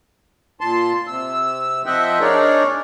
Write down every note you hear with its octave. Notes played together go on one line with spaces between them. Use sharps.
A#2 A5 C6
C3 E6
F3 C4 D#5 E5 F#5 G5
D4 D#4 G#4 A#4 C#5 D5